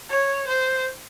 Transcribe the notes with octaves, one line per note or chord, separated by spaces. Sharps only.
C#5
C5